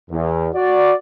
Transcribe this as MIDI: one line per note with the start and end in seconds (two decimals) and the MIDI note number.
0.11 0.49 40
0.55 0.93 66
0.55 0.93 74